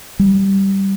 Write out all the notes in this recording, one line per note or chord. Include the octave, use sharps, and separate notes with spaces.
G3